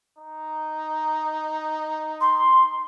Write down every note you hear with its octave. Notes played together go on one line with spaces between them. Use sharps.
D#4
C6